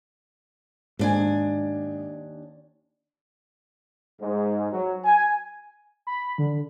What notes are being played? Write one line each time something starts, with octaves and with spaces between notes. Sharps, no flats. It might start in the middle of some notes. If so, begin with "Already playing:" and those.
D#2 G#2 D4 G#5
G#2
F#3
G#5
B5
D3